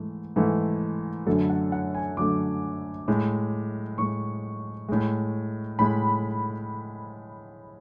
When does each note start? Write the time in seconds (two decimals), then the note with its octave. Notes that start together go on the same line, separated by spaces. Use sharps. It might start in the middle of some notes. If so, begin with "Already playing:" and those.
Already playing: G#2 E3 A3
0.36 G#2 E3 A3
1.26 F#2 D3 F#3 A3 A4
1.49 F#5
1.72 F#5
1.95 G#5
2.17 F#2 D3 F#3 A3 D6
3.08 A2 G#3
3.98 A2 G#3 C#6
4.89 A2 G#3
5.79 A2 G#3 B5